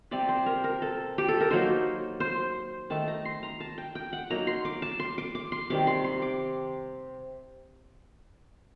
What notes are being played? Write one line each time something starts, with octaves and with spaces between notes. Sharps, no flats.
C3 G3 C4 D5
C5
A#4
A#4
A4
G4
A4
A#4
F#3 A#3 D#4 C5
C5
D#3 A3 D#4 A5
A#5
C6
A#5
A5
G5
G5
F#5
F#3 A#3 D#4 A#5
C6
D6
A5
C6
D6
D6
C6
C3 D#3 G3 D6
C6
C6
D6